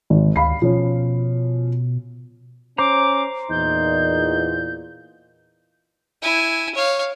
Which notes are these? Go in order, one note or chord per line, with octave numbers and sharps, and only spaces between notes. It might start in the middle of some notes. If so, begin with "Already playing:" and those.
G#1 D#3
D2 F5 B5 C7
B2 F3 C#4
C#4 C5 A#5 D6
E2 A#2 D#4 G6
E4 G#5
C#5 F5